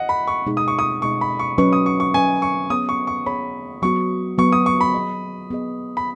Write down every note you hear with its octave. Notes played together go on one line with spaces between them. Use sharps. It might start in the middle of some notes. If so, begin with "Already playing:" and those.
Already playing: D#5 F#5
B5
C#6
B2 G#3 D#4 G#4 D#5
D#6
C#6
D#6
B2 G#3 D#4 G#4 D#5 C#6
B5
C#6
F#3 C#4 B4 D#5 C#6
D#6
C#6
C#6
F#3 C#4 B4 D#5 G#5
C#6
B3 G#4 C#5 D#6
C#6
C#6
B3 G#4 C#5 B5
F#3 B3 F#4 C#6
F#3 B3 F#4 C#6
D#6
C#6
B5
B3 G#4 D#5
B3 G#4 D#5
B5